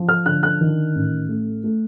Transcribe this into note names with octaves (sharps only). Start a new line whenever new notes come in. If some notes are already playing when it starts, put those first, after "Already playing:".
Already playing: F3
F6
D3 F#6
F#6
D#3
A1
A3
A3